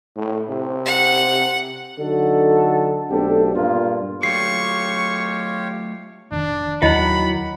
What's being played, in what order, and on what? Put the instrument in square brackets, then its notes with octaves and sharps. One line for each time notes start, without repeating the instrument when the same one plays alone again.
[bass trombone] A2
C3
[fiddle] F#5
[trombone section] D3 F#3 D#4 F#4 A4
B1 A3 C4 D4 G4 A4
G2 A#2 G3 A#3 B3 F4
[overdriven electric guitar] F#3 A3 [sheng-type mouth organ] F4 G4 C#5 [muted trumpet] C#6 [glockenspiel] C7
[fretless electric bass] F1 A#2 D#3 [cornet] D4
[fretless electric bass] D#2 [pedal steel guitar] D#3 F#3 F#5 [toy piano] E4 C#5 D#5 [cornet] B5